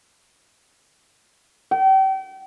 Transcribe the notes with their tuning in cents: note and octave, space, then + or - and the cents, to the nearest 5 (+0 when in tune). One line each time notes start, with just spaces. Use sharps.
G5 -35